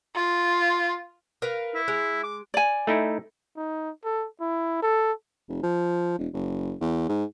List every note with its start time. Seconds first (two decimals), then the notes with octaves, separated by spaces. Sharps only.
0.16 F4
1.42 A#4 B4 F5
1.75 E4
1.88 G#3
2.23 D6
2.54 D5 G#5
2.87 A3 D#4 E4
3.57 D#4
4.04 A4
4.40 E4
4.82 A4
5.49 F1
5.63 F3
6.19 E1
6.33 F#1
6.81 E2
7.09 G#2